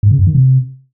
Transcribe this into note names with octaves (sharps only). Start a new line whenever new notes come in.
G#2
C#3
F#2
D#3
C3